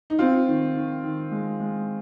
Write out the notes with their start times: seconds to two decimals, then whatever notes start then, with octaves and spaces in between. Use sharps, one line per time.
0.10 D#4
0.19 C4 F4
0.47 D#3
0.75 D#3
1.04 D#3
1.31 G#3
1.60 G#3